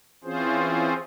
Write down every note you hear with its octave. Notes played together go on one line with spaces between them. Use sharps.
E3 C4 C#4 F4 G#4 C5